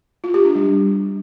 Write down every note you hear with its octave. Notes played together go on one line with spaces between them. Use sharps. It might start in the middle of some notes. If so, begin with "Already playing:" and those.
F4
G4
D4
G3